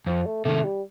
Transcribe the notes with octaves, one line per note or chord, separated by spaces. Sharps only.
F2 F3
A3
C3 D#3 A3
G3